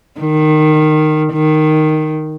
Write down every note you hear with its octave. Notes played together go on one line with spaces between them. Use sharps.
D#3
D#3